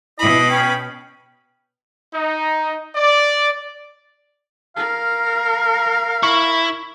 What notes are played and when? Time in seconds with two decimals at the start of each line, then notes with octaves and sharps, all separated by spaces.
0.19 B2 E4 D#5 B5
0.49 C#4 G5
2.14 D#4
2.95 D5
4.77 A#4 F5
6.23 E4 C#6